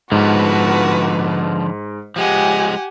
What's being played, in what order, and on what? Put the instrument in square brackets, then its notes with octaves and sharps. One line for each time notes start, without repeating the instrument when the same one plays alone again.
[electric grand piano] G#2 [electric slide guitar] D3 F3 B3 [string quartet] F#4 B4
[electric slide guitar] F3 G#3 [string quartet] G4 F#5 G#5